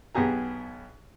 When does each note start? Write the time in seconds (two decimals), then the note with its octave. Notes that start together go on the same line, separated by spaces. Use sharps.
0.15 B1 B3 G4 G#4 A#5